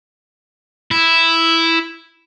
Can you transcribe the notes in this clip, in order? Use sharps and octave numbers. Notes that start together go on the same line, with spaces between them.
E4